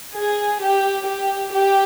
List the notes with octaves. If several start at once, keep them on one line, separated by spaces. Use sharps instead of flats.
G#4
G4
G4
G4